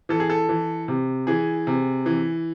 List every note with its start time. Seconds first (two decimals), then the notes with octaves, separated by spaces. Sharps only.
0.09 E3 A4
0.20 G#4
0.30 A4
0.49 E3
0.88 C3
1.27 E3 G#4
1.67 C3
2.06 E3